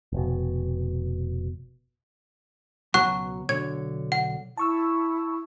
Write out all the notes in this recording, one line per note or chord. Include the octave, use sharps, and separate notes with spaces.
F1 B2
C#2 B2 F#3 F#5 C#6 F#6
B1 D3 C#5 G#6
F#5
E4 A5 C#6 E6